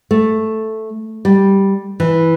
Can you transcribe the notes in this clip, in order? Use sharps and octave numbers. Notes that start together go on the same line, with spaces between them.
A3
G3
E3